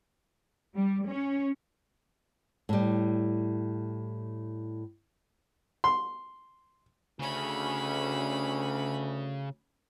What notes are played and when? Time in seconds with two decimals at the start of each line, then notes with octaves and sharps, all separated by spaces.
0.76 G3
1.08 C#4
2.69 A2 G3
5.84 C6
7.19 D2 C#3 C#4 B5